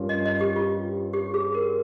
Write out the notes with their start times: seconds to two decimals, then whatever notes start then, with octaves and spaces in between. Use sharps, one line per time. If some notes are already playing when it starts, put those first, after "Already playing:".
Already playing: G2 G3 C#4 F4 A#4
0.09 D#5
0.26 D#5
0.41 G4
0.56 F4
1.13 G4
1.34 G#4
1.54 A#4